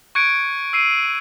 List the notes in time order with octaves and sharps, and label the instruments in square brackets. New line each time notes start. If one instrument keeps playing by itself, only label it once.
[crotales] C#6 F#6 G#6 C#7 D7
E6 C7 D#7